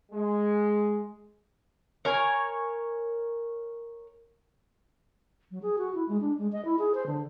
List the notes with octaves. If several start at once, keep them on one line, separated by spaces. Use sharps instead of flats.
G#3
A#4 C#5 G#5
F#3
G#4
F#4
E4
G#3
D4
G#3
D#5
E4
G#4
C5
D3